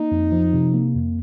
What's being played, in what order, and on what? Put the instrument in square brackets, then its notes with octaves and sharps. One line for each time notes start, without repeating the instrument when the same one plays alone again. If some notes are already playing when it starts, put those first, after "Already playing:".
Already playing: [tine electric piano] A#3 [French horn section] D#4
[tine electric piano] F2
F3
C3
A#3
F2